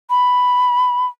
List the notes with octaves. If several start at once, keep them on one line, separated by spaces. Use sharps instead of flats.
B5